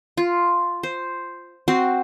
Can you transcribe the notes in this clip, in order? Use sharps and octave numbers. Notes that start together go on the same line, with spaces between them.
F4
C5
C4 F#4 C6